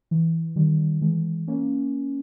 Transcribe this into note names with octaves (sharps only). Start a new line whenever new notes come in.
E3
D#3 G3
E3 G#3
A#3 C#4